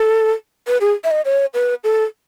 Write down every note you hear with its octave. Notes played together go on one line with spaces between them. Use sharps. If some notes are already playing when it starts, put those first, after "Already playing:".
Already playing: A4
B4
G#4
E5
D#5
C#5
B4
A4